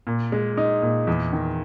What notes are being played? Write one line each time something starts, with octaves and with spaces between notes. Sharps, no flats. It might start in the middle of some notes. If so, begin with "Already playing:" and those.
A#2
G#3
D#4
A#2
E2
D#3